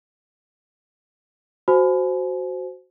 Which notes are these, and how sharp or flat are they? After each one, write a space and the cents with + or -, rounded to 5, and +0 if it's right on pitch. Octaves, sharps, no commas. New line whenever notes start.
F#4 +0 C5 -10 G#5 +30